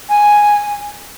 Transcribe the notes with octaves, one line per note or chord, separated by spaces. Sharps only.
G#5